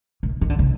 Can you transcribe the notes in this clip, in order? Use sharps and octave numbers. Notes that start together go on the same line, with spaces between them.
A#2
D#3
D3
C3